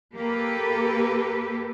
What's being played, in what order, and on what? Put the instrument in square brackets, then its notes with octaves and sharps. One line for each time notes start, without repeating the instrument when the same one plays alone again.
[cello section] A#3 G4 A4 B4